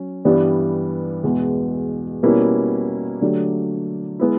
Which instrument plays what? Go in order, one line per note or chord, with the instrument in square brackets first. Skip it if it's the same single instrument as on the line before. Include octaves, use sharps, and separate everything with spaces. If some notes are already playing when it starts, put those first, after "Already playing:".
Already playing: [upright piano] F#3 C#4
G2 E3 G3 B3 D4
E2 B2 G#3
B2 G3 A#3 C#4 E4
D3 F#3 A3 D4 G4
G#3 B3 E4